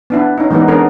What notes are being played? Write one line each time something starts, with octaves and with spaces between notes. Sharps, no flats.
B3 D4 E4
C#4 D#4
E3 G3 G#3 B3 D#4
B3 C#4 D4 G#4 A#4